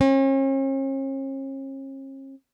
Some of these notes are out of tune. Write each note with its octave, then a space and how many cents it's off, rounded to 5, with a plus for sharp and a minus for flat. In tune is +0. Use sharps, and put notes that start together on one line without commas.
C#4 -45